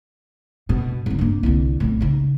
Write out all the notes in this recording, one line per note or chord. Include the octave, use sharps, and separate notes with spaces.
G2 B2
G#1 D2
G2 A#3
C2 D3
B1 A2
C#3 D#4